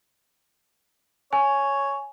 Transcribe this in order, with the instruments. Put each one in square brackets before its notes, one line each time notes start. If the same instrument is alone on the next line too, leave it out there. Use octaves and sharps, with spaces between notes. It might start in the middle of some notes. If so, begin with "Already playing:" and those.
[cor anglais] C#5 [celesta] G#5